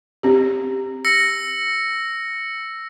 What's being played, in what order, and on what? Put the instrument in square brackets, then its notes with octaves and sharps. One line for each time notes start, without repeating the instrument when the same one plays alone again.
[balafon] C4 G4
[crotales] E6 A#6 C#7